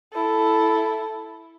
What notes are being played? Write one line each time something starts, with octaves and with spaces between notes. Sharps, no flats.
E4 A4